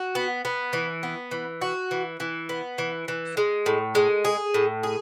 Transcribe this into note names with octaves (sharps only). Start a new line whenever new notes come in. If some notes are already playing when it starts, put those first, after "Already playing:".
Already playing: F#4
B3
B3
E3
B3
E3
F#4
E3
E3
B3
E3
E3
G#3
A2
G#3
G#4
A2
G#4